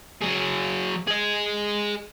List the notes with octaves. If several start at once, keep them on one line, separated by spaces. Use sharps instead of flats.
F#3 G#4
G#4 D#5